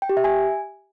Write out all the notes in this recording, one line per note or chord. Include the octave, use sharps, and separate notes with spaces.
G5
G4
E5
G#5